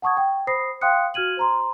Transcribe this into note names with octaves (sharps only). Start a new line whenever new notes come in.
F#5 A5 C#6 D#6 G#6
G5
C5 B5 D#6 A#6 C7
F5 G5 C6 D#6 F#6 C#7
F#4 F6 G#6 D#7 F#7
C5 A#5 C6